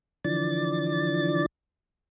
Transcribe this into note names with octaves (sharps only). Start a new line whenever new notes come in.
D3 E3 F3 D5 A6